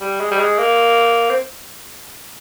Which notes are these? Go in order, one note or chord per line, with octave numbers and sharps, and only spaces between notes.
G3
G#3
G3
G#3
A#3
C4